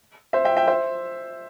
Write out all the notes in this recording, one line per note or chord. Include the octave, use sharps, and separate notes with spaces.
C5 E5
E5 G5
E5 G5
C5 E5